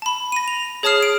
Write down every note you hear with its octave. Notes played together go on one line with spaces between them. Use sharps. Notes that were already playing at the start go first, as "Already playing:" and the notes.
A5 B5
A#6 D#7
F7
G#4 C#5 A5 D#6 F6 C7
D7